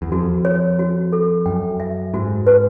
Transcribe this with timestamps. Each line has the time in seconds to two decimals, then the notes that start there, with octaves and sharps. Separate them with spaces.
0.02 E2
0.12 F2 F#4
0.45 C#5
0.79 F#4
1.13 A4
1.46 F#2 G5
1.80 E5
2.13 G#2 F#4
2.47 B4